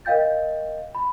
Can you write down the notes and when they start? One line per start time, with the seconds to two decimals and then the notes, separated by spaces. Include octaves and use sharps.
0.05 A#4 D#5 F5 G5 G6 A6
0.95 B5